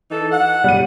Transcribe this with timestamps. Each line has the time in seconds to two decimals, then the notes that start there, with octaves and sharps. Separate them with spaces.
0.11 E3 D#4 A4
0.32 F#5
0.64 G3 D#7